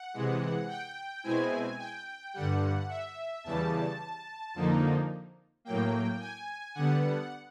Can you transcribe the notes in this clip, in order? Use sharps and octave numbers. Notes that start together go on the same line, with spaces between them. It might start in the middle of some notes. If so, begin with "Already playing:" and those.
Already playing: F#5
C3 E3 G#3
G5
B2 G#3 C4 E4 G#5
G5
G2 D3 G3 F#5
E5
E2 C#3 E3 G3 A5
F2 D3 F3 A#3 D#4
A2 F#3 A#3 G5
G#5
D3 G3 B3 F#5